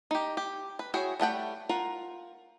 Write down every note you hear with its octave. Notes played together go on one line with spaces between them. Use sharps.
D#4 G4
G4
B4
E4 F#4 G#4 C#5 G5
G3 A3 F#5 G5
F4 A#4 F#5